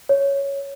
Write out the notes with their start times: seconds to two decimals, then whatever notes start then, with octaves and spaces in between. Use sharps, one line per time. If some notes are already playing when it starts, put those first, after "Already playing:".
0.09 C#5